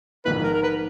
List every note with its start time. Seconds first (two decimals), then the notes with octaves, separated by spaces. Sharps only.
0.25 A#1 G#2 D#3 A#3 D#4 B4
0.43 A#4
0.54 A#4
0.63 B4